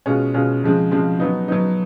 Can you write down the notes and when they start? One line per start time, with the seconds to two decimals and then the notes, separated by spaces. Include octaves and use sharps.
0.06 B2 G#3 C#4 F4
0.34 B2 G#3 C#4 F4
0.63 C#3 F3 G#3 C4
0.91 C#3 F3 G#3 C4
1.20 F#3 B3 D#4
1.48 F#3 B3 D#4